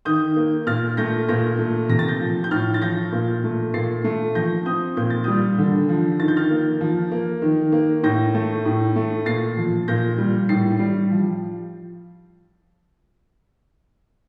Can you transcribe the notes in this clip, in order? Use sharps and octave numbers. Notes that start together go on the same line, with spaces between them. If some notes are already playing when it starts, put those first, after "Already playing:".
D#3 D#6 G6
A#3
A#2 F6 A6
A3 G6 A#6
A#2 G6 A#6
A3
C3 A#6
A6
G6 A#6
F3
G6
A2 F6 A6
A6
F3 G6 A#6
A#2
A3
A#2 A6 C7
A3
F3 G6 A#6
C4 D#6 G6
A#2 G6
A6
G3 D#6 G6
D3
F3
D#3 A6
G6
F6 A6
A#3
F3
A#3
D#3
A#3
A2 G6 A#6
A3
A2
A3
A#2 A6 C7
F3
A#2 G6 A#6
G3
A2 A6 C7
G3
F3